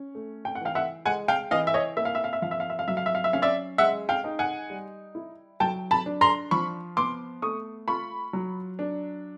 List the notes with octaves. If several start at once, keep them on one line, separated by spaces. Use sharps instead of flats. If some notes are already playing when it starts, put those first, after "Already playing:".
Already playing: C#4
A3
G5
F#5
E3 F5 G5
E5 F#5
G#3 F#5 G#5
F5 G5
E3 D#5 F5
E5
C#5 D#5
A#3 E5
F5
E5
F5
E5
F3 F5
E5
F5
E5
F5
F#3 E5
F5
E5
F5
E5
C#4 F5
D5 E5
G#3 E5 F#5
F5 G5
D#4
F#5 G#5
G3
E4
F#3 G5 A5
A5 B5
D4
A#5 C6
F3 B5 C#6
B3 C6 D6
A3 C#6 D#6
F4 B5 C#6
F#3
D4